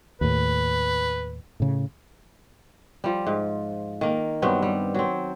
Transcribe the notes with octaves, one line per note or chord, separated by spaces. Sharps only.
D#2 A2 B4
A2 C#3
F3 G3
G#2
D#3 A#3
G2 F#3 B3 C4
G3
F#3 C4